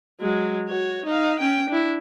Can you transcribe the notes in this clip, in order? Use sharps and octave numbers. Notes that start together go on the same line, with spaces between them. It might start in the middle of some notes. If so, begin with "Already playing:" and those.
F#3 G#3
F#4 C#5
D#4 F5
C#4 G5
D4 E4